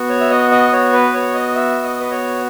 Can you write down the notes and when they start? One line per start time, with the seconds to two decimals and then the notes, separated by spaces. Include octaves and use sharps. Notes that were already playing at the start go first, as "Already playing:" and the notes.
Already playing: B3 F#4
0.10 C#5
0.21 E5
0.30 D#5
0.51 D#5
0.73 C#5
0.93 B4
1.14 C#5
1.34 D#5
1.56 E5
1.83 D#5
2.00 B4
2.11 C#5